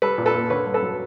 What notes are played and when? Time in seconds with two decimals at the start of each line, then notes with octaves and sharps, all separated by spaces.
0.02 G3 A4 B4
0.18 A#2
0.26 A4 B4
0.35 A#3
0.50 D3 B4 C#5
0.66 G2
0.74 A4 B4
0.82 F#3